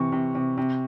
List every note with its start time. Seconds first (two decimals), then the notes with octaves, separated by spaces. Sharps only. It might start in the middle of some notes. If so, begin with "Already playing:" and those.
Already playing: C3 E3 C#6
0.12 C3
0.35 C3
0.58 C3